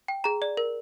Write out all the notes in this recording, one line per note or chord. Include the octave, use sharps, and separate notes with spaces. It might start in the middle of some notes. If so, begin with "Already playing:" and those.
G5
G#4 A#5
D5
A#4